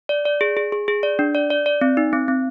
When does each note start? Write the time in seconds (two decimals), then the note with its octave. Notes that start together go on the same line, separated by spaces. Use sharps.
0.09 D5
0.25 D5
0.41 G#4
0.57 G#4
0.72 G#4
0.88 G#4
1.03 D5
1.19 D4
1.35 D5
1.50 D5
1.66 D5
1.81 C4
1.97 D#4
2.13 C4
2.28 C4